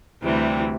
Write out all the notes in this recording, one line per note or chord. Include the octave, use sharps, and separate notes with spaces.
D2 C3 E3 G3